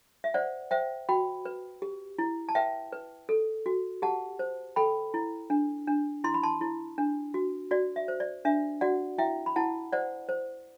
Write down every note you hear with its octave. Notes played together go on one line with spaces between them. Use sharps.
E5
C5 D5 F#5
C5 E5 G5
F#4 G5 B5
B4
G4
E4
A5
B4 E5 G5
B4
A4
F#4
G4 F#5 A5
C5
A4 G5 B5
E4
D4
D4
E4 C6
B5
A5 C6
E4
D4
F#4
F#4 D5
E5
C5
D5
D4 E5
F#4 D5 F#5
E4 E5 G5
B5
E4 F#5 A5
C5 D5 F#5
C5